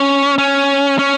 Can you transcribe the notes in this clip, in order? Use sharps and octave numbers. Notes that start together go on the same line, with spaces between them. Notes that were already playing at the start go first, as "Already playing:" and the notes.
Already playing: C#4
C#4
C#4